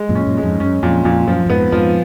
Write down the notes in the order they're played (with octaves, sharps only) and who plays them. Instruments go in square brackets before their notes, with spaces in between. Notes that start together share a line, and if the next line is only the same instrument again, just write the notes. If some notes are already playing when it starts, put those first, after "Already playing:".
Already playing: [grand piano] G#3
[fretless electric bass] F#2 A#2
[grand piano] C#4
[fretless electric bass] F#2 A#2
[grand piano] G#3
[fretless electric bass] F2 G#2
[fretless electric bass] F#2 [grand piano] C#4
[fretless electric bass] F2 [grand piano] A#2
[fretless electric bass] F2 [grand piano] A#2
[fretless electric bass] F#2 [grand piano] F3
[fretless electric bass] F#2
[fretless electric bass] F2 G#2 [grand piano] B3
[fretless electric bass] F2 G#2 [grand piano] F3